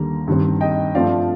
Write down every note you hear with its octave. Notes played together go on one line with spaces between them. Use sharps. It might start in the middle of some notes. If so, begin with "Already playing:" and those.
Already playing: D#2 D3 G3 A#3 A#5
G2 D#3 G3 C4
D#5 G5
G2 F3 A3 C4 D5 F5